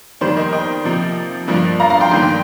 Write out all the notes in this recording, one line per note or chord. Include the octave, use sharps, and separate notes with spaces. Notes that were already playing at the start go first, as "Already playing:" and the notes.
F2 D#3 G3 A#3 C5
A#4 D#5
D#5 G5
C3 F3 A#3
G2 F3 A#3
F5 A#5
F5 A#5
G5 C6
G2 D#3 A#3 G5 C6
G5 C6